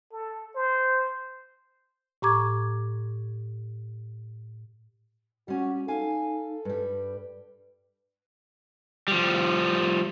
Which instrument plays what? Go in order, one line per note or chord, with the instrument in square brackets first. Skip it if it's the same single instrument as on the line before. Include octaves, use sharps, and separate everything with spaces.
[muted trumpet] A4
C5
[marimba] A2 G4 A#5 C#6 D6 G#6
[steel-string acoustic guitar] G3 C#4 [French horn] F#4
[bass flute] D#4 [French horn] A4 [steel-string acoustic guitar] F5 G#5
[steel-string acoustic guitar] G2 G3 [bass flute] B4
[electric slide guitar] F3 G3